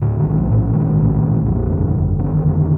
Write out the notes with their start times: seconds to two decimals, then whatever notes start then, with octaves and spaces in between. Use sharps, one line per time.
0.02 A2 D3
0.19 D#3
0.25 A#1
0.37 F3
0.50 A2
0.73 A#1 D#3
0.98 A2
1.09 D#3
1.23 A#1
1.46 F2 D3
1.71 G1
1.95 G1
2.19 D3 D#3
2.43 F2